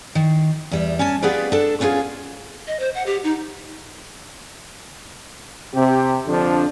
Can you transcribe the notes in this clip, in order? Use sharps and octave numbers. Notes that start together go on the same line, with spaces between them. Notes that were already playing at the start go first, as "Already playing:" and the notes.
D#3
E2 G3 E5
C#4 G#5 A5
B3 F4 G4 G#4 B4 D5
D4 A4
B3 C#4 F4 F#4 G#4
D#5
C5
F#5
G4
D#4
C3 G4
F2 D3 F3 D4